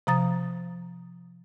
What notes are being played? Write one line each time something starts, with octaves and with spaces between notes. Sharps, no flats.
C3 F3 A#5 D#6 A6